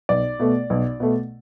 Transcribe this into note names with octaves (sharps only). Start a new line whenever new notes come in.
B1 D5
B2 A3
B1
B2 A3